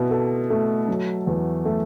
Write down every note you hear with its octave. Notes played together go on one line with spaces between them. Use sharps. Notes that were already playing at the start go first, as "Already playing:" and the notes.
Already playing: B2 E4
A4
A3
F#3
E2
A3